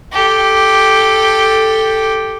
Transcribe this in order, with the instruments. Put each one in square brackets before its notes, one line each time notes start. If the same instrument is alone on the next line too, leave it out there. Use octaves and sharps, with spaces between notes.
[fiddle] G4 A4